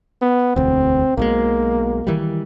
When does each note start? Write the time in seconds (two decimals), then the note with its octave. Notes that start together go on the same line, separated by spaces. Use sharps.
0.22 B3
0.56 E1 D2 C4
1.18 B1 B2 G#3 A#3
2.07 D#3 E3 G3